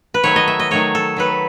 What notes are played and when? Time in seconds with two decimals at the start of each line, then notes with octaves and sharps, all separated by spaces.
0.14 B4
0.24 D#3 F#3 A3 C#5
0.36 D#5
0.48 E5
0.59 D#5
0.71 D#3 F#3 A3 C#5
0.95 A4
1.16 D#3 F#3 A3 B4